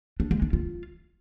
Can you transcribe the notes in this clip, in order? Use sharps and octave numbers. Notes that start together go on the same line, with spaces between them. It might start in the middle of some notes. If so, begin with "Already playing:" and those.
D4
G#3
D4
F4